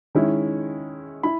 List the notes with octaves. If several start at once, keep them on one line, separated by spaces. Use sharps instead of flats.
D#3 G#3 C#4 E4
E4 B5